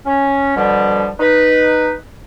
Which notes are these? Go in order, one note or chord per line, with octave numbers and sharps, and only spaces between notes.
C#4
B2 D3 F3 G3
D#4 B4